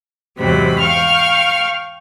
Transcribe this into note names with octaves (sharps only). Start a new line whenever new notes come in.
E2 G#2 C3 F#3 C4 B5
F5 G5 C#6 F6